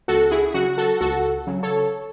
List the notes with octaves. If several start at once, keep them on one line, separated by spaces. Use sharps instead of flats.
C#2 F#4 A4
E4 G#4
C#3 F#3 F#4
F#4 A4
C#2 F#4 A4
C#3 F#3
A4 C#5